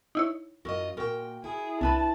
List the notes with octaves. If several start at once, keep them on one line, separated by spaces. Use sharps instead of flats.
D#4 E4 C#5
F#2 F4 F#4 A#4 D#5
A#2 F#4 A#4 G5
E4 G#4
C2 D4 B4 A5 B5